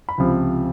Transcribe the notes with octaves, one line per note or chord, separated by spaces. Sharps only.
B5
C#2 C3 F3